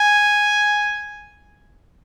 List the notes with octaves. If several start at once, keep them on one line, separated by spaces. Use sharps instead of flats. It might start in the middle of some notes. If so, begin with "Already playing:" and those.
Already playing: G#5